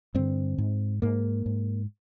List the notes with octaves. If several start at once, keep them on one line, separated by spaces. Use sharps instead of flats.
G2 D3 C4
G#2
G#2 A#3
G#2